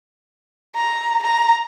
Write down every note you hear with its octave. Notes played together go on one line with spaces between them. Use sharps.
A#5
A#5